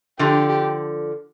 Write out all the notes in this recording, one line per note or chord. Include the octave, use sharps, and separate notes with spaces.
D3 F3 G4